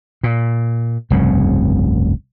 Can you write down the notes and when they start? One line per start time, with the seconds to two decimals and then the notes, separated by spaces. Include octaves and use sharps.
0.23 A#2
1.10 F1 C2 G2 C#3